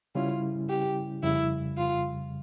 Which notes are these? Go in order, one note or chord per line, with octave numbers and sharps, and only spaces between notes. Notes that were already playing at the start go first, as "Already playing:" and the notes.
C#3 G3 C#4 E4 F4
G4
F2 C#3 G3 E4
F4